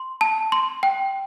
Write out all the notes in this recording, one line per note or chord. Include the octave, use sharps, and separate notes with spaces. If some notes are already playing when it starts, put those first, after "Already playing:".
Already playing: C6
A5
C6
G5